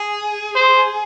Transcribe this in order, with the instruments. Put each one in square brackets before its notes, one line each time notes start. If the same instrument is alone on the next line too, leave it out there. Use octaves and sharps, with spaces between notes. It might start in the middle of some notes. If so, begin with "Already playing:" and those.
Already playing: [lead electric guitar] G#4
[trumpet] C5